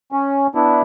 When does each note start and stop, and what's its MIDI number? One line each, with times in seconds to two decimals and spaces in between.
0.12 0.47 61
0.55 0.82 59
0.55 0.82 62
0.55 0.82 64